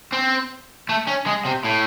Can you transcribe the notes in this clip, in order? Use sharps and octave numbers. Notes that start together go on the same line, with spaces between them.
C4
A3
C#4
G#3
C3
A2